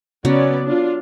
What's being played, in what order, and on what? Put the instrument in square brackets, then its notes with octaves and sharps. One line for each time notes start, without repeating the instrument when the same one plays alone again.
[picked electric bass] C#3 [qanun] F#3 [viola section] B3 C#4 D5
[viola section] D4 F4